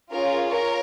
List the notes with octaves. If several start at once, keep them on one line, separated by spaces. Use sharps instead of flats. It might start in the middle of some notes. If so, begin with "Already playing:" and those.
C#4 F4 G#4 A#4 C#5
A#4 C#5